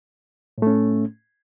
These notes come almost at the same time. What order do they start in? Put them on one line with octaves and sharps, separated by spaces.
A2 A3 C#4